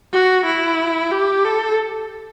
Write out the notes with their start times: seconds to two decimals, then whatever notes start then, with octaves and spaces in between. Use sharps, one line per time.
0.12 F#4
0.45 E4
1.11 G4
1.44 A4